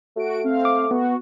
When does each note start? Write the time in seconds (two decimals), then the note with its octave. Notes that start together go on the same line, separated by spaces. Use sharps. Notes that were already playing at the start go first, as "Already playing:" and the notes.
0.17 A3 F#4 D7
0.44 C4 F5
0.65 D6
0.91 B3 F#4